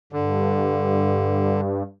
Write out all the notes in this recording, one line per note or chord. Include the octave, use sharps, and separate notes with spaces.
G2 D3